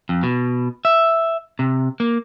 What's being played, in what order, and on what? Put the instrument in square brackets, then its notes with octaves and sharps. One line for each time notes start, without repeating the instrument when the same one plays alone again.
[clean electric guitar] F2
B2
E5
C3
A#3